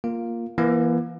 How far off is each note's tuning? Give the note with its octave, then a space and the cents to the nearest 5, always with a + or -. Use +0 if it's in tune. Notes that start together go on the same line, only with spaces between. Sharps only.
A#3 +0 F4 +0
E3 +20 A#3 +40